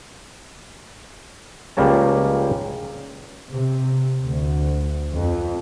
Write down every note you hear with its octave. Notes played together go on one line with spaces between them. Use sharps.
C#2 F3 G3 A#3 C#4 A5
C3
D2
F2